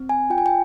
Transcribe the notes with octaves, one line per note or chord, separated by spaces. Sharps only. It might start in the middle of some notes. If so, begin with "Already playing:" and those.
Already playing: C4
G#5
F4 G5
G#5
G5